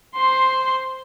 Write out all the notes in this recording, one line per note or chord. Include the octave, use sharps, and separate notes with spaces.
C5 C6